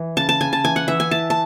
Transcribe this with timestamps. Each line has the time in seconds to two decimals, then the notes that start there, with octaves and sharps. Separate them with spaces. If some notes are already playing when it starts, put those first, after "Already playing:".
Already playing: E3
0.17 C#3 A5
0.29 A5
0.41 C#3 G#5
0.53 A5
0.64 E3 G#5
0.76 F#5
0.87 E3 E5
1.00 G#5
1.11 E4 A5
1.30 A5